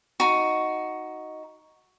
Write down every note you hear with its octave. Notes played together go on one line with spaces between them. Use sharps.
D#4 F#4